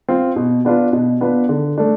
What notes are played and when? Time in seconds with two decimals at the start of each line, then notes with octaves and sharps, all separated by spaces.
0.09 C4 F4
0.36 B2
0.65 B3 D4 F4 B4
0.93 B2
1.21 B3 D4 F4 B4
1.49 D3
1.78 A3 D4